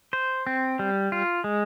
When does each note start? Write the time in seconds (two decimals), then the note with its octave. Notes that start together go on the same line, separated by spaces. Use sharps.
0.13 C5
0.47 C4
0.79 G3
1.12 F4
1.44 G#3